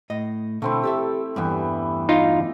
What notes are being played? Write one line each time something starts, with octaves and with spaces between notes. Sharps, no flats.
A2 D#5
B2 D3 A3 C4 E4
G4 A4 E5
E2 G2 E3 G3 B3
D#4 F4